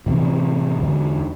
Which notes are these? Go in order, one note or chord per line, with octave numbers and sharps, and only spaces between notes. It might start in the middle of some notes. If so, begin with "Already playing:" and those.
A2 C3 E3 C4
E2 D3